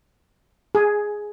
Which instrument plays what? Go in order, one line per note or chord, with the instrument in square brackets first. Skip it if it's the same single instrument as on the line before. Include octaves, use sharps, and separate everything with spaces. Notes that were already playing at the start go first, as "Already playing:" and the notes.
[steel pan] G#4